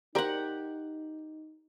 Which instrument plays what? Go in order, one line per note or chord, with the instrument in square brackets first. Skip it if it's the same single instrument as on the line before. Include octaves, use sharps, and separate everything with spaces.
[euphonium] D#4 [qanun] G4 F#5 [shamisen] A#4 C5 D5